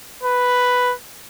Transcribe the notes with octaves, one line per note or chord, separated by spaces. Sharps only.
B4